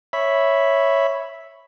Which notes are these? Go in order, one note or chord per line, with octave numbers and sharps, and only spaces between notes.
C#5 E5 B5